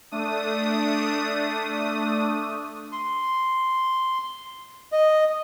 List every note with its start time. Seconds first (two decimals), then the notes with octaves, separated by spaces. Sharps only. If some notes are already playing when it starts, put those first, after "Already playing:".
0.11 A3 D4 D#6
2.92 C6
4.92 D#5